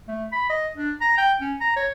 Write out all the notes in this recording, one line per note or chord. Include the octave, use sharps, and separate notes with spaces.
A3
B5
D#5
D4
A#5
G5
C#4
A#5
C#5